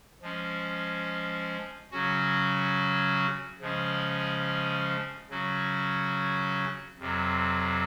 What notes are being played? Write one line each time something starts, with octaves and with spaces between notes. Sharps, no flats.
F3 G#3 C#4
C#3 F#3 C#4 F#4
C#3 F3 G#3 C#4
C#3 F#3 C#4 F#4
F2 C3 F#3